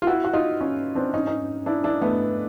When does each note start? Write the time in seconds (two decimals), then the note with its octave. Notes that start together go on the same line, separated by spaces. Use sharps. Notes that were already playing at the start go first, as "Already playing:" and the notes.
0.02 F4
0.07 E4 F#4
0.24 F#4
0.33 D#4 F4
0.61 C#4 D#4
0.95 C4 D4
1.14 C#4 D#4
1.26 C#4 D#4
1.66 D4 E4
1.84 D4 E4
2.02 A3 B3